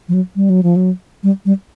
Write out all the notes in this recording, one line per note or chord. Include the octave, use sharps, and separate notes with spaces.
F3
F#3
G3
F#3
F3
F#3
G3
G3